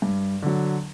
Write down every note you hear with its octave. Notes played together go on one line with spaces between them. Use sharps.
G2
D3 F#3